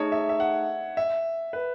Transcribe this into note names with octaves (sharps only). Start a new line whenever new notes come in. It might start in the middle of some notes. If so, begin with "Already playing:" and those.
Already playing: A3 D#4 G#4 C#5 D#5 A5
E5
E5
F#5
E5
B4